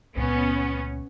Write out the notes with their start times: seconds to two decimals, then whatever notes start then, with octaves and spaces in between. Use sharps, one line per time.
0.16 C#2 A#2 B3 C#4